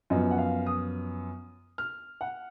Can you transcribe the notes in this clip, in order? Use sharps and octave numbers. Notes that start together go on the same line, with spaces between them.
F#2 F3 B3 D#5
F#5
F5
D#6
F6
F#5